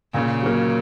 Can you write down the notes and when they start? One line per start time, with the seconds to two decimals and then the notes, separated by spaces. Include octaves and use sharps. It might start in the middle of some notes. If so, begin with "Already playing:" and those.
0.14 A#2 C#3
0.42 F#3 A#3